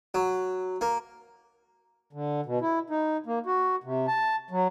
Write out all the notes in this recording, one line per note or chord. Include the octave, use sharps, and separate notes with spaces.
F#3
A#3
D3
B2
E4
D#4
A#3
F#4
C3
A5
F#3